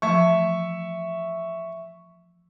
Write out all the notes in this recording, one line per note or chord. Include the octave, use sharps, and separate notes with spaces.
E3 F3 A3 E5 C#6